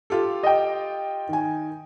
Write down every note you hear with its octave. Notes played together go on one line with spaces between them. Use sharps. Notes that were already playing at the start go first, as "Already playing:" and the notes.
F4 G4 A4
D#5 G5
D#3 G#5